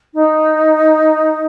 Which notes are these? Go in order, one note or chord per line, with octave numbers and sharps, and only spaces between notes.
D#4